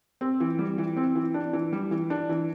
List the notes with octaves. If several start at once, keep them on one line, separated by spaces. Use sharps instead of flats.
C4
E3
G3
E3
C4
E3
D4
E3
G3
E3
D4
E3